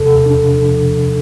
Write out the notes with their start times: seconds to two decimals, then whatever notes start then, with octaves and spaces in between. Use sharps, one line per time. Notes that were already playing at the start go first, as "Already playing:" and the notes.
Already playing: E2 C3 A4
0.26 D4